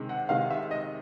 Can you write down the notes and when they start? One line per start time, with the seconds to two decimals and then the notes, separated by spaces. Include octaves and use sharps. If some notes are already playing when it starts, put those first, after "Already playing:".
Already playing: C3 D#3 G#3
0.09 F#5
0.29 C3 D#3 G#3 F5
0.51 E5
0.71 D#5